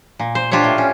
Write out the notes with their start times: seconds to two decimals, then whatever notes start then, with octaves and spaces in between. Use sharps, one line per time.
0.19 A#2
0.35 C5
0.51 D4 F4 G4 C5 C#5
0.64 A2
0.78 C#4